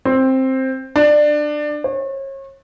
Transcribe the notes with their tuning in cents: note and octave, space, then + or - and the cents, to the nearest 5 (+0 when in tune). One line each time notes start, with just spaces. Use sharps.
C4 +10
D4 +20
C#5 -35